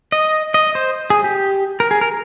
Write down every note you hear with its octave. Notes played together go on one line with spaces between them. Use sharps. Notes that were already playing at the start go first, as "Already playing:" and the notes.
D#5
D#5
C5
G#4
G4
A#4
G#4
A#4